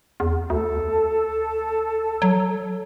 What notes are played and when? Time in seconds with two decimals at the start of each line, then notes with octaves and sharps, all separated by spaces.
0.20 E2
0.50 D2 A4
2.22 F#3